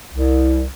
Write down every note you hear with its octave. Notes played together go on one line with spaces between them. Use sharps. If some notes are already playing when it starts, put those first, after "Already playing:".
C2